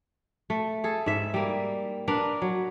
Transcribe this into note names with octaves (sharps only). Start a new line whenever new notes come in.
A3
G#4 A4
G#2 E5
G3 A#3
D4 A#4 B4 F5
F#3